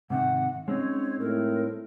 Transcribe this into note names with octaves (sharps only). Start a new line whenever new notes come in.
G#2 C3 D#3 F#5
G#3 C4 C#4 D#4 C#5
A2 A#4